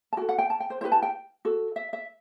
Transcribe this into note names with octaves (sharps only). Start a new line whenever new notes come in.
A5
F#4 A4 G5
F#5
G5
A5
G5
C5
E4 G4 B4 C5
A5
G5
F#4 A4
E5
E5